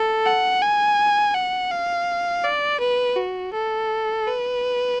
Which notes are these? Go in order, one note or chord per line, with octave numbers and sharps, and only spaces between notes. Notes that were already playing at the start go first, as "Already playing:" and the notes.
Already playing: A4
F#5
G#5
F#5
F5
D5
B4
F#4
A4
B4